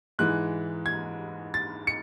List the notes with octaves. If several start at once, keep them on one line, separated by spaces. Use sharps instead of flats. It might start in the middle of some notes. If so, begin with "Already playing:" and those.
G#2 E3 G#3 F#6
G#6
A6
C#7